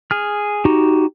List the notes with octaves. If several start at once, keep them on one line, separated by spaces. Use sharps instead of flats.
G#4 F6
D#4 F#4 G4